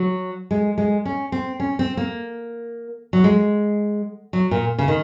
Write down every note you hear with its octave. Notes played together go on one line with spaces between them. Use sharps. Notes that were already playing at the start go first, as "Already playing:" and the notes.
Already playing: F#3
G#3
G#3
C#4
C4
C#4
C4
A#3
F#3
G#3
F#3
A#2
C#3
D#3